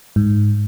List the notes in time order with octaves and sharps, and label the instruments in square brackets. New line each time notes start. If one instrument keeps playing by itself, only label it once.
[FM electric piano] G#2